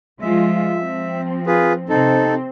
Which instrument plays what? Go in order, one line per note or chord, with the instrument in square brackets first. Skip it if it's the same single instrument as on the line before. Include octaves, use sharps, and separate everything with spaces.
[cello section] F3 G#3 F4 [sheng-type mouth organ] E5
[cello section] F3 C4
[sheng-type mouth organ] F4 G#4 B4
[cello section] C3 C4 [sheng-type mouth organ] D#4 A4